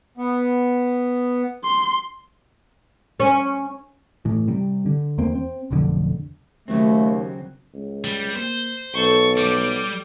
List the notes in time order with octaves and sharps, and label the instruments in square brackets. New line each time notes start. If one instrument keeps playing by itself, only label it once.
[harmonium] B3
[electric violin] C6
[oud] C#4
[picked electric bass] A2 E3
C3 G3
D3
E2 A#3 C4
C4
F1 B1 F2 D3
[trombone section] D#2 [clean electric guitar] C#3 F#3 C4 [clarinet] A3
[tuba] C#2
[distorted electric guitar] G3
[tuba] A#3 [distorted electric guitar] C5
[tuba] B1 [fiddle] A4 C#6
[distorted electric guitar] G3 [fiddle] D6